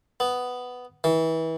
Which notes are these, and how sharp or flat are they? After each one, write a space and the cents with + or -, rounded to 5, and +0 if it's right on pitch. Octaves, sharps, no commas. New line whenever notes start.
B3 +10
E3 -30